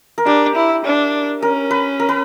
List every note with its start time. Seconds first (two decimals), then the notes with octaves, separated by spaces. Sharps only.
0.18 A#4
0.26 D4 G4
0.55 E4
0.85 D4
1.42 C#4 A#4
1.71 B4
2.00 A#4
2.09 B4